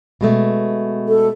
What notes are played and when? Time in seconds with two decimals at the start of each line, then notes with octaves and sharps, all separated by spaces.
0.21 B2 G#3 A3
1.08 A4